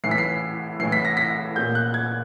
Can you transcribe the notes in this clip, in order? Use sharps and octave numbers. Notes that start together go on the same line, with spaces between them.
A2 E3 C7
B6
C7
A2 E3 C7
B6
A#6
B6
A#2 G6
F#6
G#6